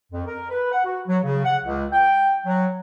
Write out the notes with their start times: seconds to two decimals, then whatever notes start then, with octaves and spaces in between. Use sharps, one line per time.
0.12 F2
0.26 A#4
0.50 B4
0.72 F#5
0.85 F#4
1.08 F#3
1.23 C#3
1.45 F#5
1.64 C#2
1.92 G5
2.46 F#3